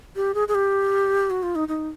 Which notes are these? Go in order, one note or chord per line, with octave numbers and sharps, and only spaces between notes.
G4
G#4
G#4
G4
F#4
F4
D#4
D#4